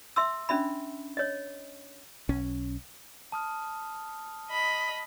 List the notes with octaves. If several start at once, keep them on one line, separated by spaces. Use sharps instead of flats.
E5 C6 E6
C#4 D4 E5 B5
C#5 D#5
B1 C#4
A5 D#6 F6
D#5 B5